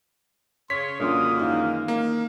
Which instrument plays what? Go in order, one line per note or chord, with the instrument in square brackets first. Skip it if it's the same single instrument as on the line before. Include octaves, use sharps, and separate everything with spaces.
[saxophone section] C#3 C#5 [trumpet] C6 [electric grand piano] B6
[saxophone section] F#2 G#3 A#3 [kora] D3 C#4 F4 [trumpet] D#6
[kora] D#3 E3 [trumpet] F5
[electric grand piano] A#3 [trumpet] D#4